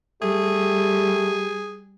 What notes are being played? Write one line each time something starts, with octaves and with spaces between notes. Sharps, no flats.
G3 A3 G4 G#4